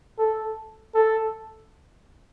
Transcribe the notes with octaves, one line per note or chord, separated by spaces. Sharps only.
A4
A4